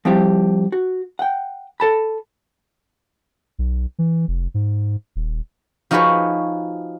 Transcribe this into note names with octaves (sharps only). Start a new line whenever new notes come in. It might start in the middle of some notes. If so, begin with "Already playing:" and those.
F3 G3 C4 E4 G4
F#4
F#5 G5
A4 A5 B5
B1
E3
F1
G#2
D#1
F3 D#4 F#4 G#4 B4 C#5